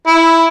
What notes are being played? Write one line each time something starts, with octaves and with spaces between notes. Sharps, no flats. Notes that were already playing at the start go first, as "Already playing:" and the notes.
E4